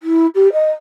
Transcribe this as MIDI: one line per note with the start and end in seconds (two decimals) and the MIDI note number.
0.02 0.26 64
0.34 0.51 67
0.52 0.69 75